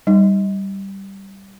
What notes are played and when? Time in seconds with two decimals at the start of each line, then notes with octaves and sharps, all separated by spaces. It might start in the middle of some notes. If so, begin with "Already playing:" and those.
0.07 G3 D#4